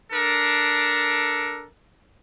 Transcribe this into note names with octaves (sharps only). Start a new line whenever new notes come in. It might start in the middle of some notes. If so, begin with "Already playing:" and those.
D4 A4 A#4